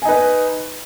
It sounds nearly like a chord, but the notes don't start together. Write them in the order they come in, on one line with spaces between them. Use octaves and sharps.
G#5 D#4 B4